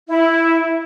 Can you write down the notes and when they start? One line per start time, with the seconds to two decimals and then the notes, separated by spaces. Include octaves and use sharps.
0.08 E4